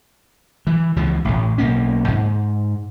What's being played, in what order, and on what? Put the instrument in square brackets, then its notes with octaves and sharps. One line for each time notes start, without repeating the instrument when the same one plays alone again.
[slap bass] E3
C#2 E3 F3
A1 A2
B1 A#3 C#4
G#2